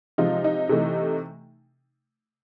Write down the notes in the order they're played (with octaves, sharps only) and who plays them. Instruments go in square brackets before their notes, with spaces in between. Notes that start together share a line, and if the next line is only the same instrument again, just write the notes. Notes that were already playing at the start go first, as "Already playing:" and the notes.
[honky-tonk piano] C3 F3 G#3 D#4 F4
D#4
C3 E3 A3